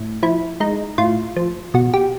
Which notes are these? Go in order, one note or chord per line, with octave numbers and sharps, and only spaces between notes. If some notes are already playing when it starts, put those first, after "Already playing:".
Already playing: A2
F3 E4
G#3 D#4
A2 F4
F3
B2 F#4
G4